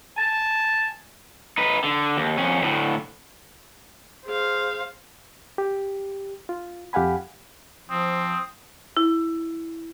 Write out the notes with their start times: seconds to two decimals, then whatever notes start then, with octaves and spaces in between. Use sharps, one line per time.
0.16 G#5 A5
1.58 D#4 B4
1.84 D3
2.17 D#2
2.38 F2 C#4
2.62 D2 A2
4.26 G#4 C5 F5
5.58 G4
6.49 F4
6.93 F2 G4 F5 F#5 G#5 B5
7.89 F3 C4 D#6
8.97 E4